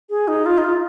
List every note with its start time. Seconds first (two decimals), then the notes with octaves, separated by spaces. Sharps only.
0.10 G#4
0.28 D#4
0.46 F4
0.58 D#4
0.64 F4